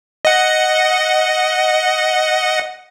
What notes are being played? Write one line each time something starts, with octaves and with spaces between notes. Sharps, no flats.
D#5 F#5